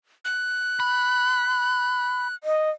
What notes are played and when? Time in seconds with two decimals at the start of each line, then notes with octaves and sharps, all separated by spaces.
0.25 F#6
0.80 B5
2.44 D#5